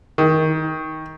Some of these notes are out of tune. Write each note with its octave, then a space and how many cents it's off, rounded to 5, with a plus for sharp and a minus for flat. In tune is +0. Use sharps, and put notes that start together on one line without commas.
D#3 +20